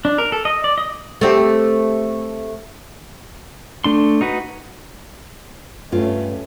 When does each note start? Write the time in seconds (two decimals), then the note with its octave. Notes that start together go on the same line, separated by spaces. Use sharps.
0.05 D4
0.18 A#4
0.32 A4
0.45 D#5
0.64 D5
0.78 D#5
1.21 A3 C4 G4
3.84 A3 D4 C6
4.21 D#4 F#4 B4
5.92 G2 A3 C#4 F4